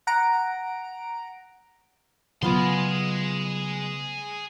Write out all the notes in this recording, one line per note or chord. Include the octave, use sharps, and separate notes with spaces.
F#5 A#5 D7
C#3 F#3 B3 F4 G#4 C6